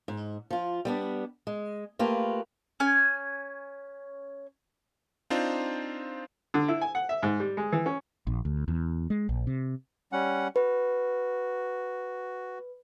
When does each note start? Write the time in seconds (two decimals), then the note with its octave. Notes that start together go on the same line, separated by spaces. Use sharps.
0.08 G#2
0.50 F3 F4
0.85 G3 B3 D4
1.47 G#3
1.99 A3 A#3 F4 G4 B4
2.80 C#4 G#5
5.30 C4 D4 D#4 F4 C5
6.54 D3
6.68 E4
6.81 G#5
6.95 F#5
7.09 E5
7.23 G#2
7.40 G3
7.57 G#3
7.72 E3
7.86 C#4
8.27 A#1
8.45 D2
8.68 E2
9.10 G#3
9.29 A#1
9.47 C3
10.12 G3 C#4 F#5
10.56 F#4 B4